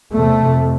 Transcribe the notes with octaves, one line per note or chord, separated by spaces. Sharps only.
E2 C3 A3
F2 C3